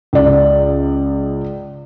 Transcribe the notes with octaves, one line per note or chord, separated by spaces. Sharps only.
C#2 D5